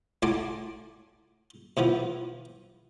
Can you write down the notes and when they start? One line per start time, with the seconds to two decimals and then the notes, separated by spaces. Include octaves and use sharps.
0.22 A2 F#4 G#5 A5 C6 D6
1.77 B2 E3 F3 B3